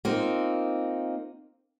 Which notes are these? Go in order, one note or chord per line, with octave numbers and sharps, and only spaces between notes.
A#3 C4 D#4 F4